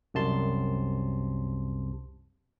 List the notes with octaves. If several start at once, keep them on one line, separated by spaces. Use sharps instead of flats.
C2 F#2 C3 A5 C6